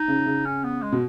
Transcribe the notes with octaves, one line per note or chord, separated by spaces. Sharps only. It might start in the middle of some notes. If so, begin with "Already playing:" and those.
Already playing: D#4
C#3
C#3
C#4
B3
G#3
B2